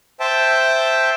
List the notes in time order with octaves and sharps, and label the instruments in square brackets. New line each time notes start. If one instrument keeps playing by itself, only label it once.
[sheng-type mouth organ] C5 E5 G5 A5